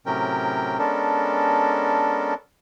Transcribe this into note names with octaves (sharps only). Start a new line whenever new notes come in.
A2 C3 F#3 C#4 A#4 G5
G#3 B3 C#4 D4 A4 A#4